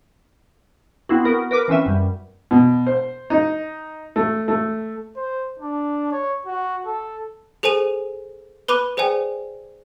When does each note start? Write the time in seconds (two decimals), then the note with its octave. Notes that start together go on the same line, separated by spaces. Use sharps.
1.09 B3 C4 E4 F#4
1.24 B3 F#4 A#4
1.51 A#4 B4 D6
1.68 E3 C4 C#4 B4 E5
1.86 F#2 G3
2.51 B2
2.87 C5
3.30 D#4
4.16 A3
4.48 A3
5.17 C5
5.60 D4
6.12 C#5
6.47 F#4
6.86 A4
7.63 G#4 A4 C5 G#5 D#7 F7
8.68 B4 B5 D6 F#6 D#7
8.97 G#4 C5 D5 G5 G#5